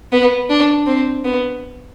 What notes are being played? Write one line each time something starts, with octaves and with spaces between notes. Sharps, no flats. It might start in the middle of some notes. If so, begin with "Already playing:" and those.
B3
D4
C4
B3